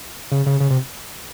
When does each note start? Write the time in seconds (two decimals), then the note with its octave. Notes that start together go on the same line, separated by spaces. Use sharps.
0.32 C#3
0.46 C#3
0.60 C#3
0.70 C3